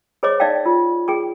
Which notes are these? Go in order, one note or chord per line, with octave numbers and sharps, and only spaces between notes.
G#4 C5 C#5 D#5 D6
D#4 D5 D#5 F5 G5
F4
G#4 G5 C#6